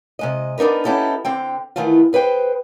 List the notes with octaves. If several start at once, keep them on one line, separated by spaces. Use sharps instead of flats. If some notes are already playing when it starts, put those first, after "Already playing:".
C3 G#3 D#5
B3 D4 D#4 A#4 B4
B3 C#4 D#4 E4 G4 A4
D3 C4 G5
D#3 E3 A3 B3 F4
G#4 B4 C5 G5